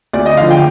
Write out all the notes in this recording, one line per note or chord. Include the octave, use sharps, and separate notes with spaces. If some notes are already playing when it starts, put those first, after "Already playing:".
D2 D5
D#5
D3 F3 F5
G5